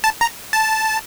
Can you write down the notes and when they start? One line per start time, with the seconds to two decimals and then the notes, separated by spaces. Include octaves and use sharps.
0.04 A5
0.21 A#5
0.53 A5